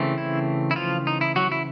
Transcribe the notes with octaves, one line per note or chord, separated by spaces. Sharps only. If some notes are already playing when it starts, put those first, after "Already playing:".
Already playing: C#3 E3 A3 C4
E4
E4
F3 F4
D#4
E4
F#3 F#4
E4